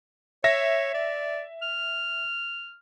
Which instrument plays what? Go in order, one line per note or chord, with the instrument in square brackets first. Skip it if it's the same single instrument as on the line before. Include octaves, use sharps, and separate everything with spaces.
[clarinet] C#5 [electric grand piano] E5 A#6
[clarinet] D5
F6